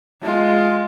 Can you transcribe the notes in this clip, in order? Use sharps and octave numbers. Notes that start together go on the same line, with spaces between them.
G#3 F4